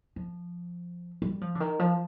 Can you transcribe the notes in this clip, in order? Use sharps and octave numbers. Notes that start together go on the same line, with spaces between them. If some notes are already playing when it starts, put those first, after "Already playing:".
F3
G3
F3
D3
D#3
F3